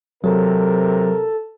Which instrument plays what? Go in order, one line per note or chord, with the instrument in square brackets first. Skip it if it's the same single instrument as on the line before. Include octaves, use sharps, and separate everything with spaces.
[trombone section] C3 A#4 [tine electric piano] F#3 [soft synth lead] A4